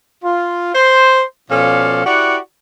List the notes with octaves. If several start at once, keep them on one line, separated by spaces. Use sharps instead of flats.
F4
C5
B2 F3 C#4 A4 D5 F5
E4 F#4 G4 D5 F#5